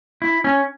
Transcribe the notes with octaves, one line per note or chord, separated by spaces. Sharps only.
E4
C#4